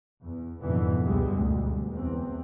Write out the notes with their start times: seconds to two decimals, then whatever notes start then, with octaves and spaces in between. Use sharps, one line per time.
0.22 E2
0.62 F2 G#2 B2 D3 E3 B3
1.03 C#2 F#2 B2 D3 G3 G#3
1.31 D2
1.90 E2 C4